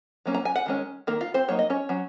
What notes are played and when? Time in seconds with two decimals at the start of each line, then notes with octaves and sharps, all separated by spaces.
0.26 F#3 A#3 C#4
0.34 A#5
0.45 G#5
0.56 F#5
0.66 D#3 G#3 C#4
1.07 D#3 A#3 A#4
1.21 F4
1.34 C4 C5
1.48 F#3 A#3 D#4 C#5
1.59 D#5
1.70 C#4 C#5
1.89 F#3 C#4